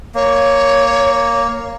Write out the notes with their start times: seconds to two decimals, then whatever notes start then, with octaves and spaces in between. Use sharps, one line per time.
0.15 A#3 C#5